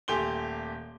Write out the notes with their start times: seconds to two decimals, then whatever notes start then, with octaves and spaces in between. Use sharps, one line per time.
0.08 D#1 A3 G4 G#5 C6 G7